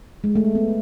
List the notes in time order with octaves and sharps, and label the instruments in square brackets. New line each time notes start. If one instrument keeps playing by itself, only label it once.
[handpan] G#3
A3
B3